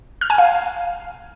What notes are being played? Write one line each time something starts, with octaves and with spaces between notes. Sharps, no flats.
F6
G#5
F5